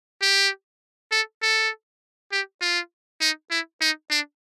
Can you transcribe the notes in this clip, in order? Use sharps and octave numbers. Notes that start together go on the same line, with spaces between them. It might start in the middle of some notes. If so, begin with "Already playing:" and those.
G4
A4
A4
G4
F4
D#4
E4
D#4
D4